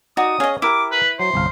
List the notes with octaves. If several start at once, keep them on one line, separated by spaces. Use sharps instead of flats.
D#4 F#4 D5 D#6
C#4 G#4 C#5 D#5 F5
E4 G4 A#4 E5 D6
B4
F#3 C5
G1 C2 F5